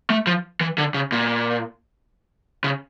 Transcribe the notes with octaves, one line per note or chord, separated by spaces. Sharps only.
A3
F3
E3
D3
C#3
A#2
C#3